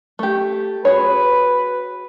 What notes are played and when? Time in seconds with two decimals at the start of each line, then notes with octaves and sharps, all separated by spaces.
0.19 A3 G4
0.85 F#4 G#4 B4 C#5